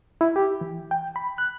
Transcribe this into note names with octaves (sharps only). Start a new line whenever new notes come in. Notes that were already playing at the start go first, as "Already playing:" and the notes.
E4
G4
E3
G5
B5
F#6